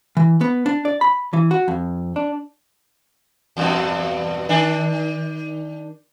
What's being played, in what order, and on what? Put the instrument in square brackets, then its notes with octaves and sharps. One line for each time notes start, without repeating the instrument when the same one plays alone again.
[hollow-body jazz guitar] E3
B3
D4
D5
B5
E3
F#4
F2
D4
[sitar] E2 G2 B2
D#3 D4